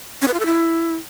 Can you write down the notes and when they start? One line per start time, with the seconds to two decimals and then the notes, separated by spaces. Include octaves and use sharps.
0.22 C#4
0.28 B4
0.34 F4
0.40 A4
0.46 E4